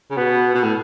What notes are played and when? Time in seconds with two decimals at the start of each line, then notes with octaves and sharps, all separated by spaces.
0.10 C#3
0.17 B2 B3
0.54 B2
0.63 A2